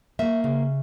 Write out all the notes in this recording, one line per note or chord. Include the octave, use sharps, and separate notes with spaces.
A#3 E5
C#3